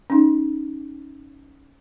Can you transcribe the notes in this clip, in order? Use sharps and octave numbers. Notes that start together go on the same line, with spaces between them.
C#4 D#4